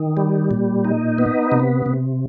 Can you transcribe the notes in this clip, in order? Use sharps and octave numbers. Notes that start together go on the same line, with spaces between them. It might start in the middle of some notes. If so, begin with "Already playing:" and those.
Already playing: D#3
G3
A#2
D#4
B3
C3
C3